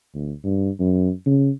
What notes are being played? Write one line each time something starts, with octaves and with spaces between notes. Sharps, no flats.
D2
G2
F#2
C#3